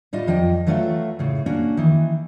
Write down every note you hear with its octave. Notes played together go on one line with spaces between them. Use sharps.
A2 G3 F4 D#5
F2 F3 D#5 G5
E3 F#3 A3 F4 D#5 E5
A2 C#3
A#3 C#4 D4 F#4
D#3 E3